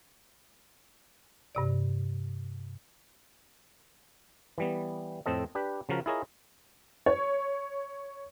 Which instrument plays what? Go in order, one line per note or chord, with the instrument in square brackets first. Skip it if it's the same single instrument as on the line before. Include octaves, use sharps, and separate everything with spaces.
[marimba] G2 C3 D5
[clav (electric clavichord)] E3 G3 B3
F2 A2 C4 A4 D#5
D4 G4 B4
C#3 F3 F#4 A#4
E4 F4 G#4 A#4 C#5 D#5
[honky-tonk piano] C#5